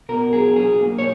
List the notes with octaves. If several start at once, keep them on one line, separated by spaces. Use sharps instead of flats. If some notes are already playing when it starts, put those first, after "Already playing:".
B2 A#4
B1 G#4
B1 G#4
A#3
C#5